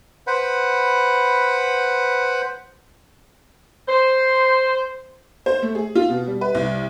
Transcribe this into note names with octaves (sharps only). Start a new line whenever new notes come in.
B4 C5 F#5 B5
C5
C5
A3
G#4
F4
B2
G3
B4
C2